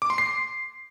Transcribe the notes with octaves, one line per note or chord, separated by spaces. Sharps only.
D6
C6
C7